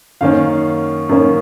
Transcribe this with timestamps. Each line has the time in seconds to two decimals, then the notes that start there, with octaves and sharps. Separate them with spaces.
0.21 F#2 D#3 A#3 C#4 F5
1.09 F#2 D#3 A#3 C#4